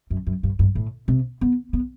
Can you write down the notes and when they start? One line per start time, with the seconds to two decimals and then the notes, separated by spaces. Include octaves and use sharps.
0.10 F#2
0.27 F#2
0.43 G2
0.59 G2
0.75 A2
1.08 C3
1.41 B3
1.73 B3